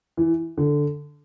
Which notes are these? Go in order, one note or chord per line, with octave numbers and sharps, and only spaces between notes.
E3
D3